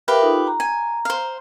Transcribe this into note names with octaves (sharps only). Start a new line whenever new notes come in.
G4 A#4 B4 E5 F5
D#4 F4 A4
A#5
G#5
C5 F5